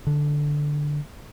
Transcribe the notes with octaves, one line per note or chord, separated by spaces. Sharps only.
D3